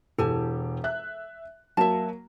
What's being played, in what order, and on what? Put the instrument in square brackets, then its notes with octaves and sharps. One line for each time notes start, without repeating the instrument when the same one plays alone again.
[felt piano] E1 E3 G4 [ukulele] A4 G#5 A5
[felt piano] E5 F#6
[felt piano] F#3 A#3 [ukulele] E5 A5